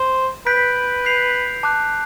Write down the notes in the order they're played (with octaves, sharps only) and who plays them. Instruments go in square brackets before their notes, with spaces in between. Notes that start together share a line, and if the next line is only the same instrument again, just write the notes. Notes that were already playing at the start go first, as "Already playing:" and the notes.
Already playing: [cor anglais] C5
[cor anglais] B4 [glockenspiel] G6 B6 D7
[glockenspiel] G6 C7 F7
A5 D6 F#6